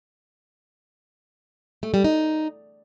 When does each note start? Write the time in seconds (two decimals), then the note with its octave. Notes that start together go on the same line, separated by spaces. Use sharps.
1.83 A3
1.94 G3
2.04 D#4